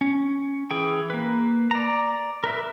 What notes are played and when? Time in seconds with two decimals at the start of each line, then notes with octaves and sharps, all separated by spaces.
0.01 C#4
0.71 E3 G#4 G5
1.10 A#3 B4
1.71 D5 A#5
2.44 A#4 B4 E5